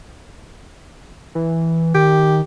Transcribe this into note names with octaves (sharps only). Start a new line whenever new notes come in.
E3
D#3 G4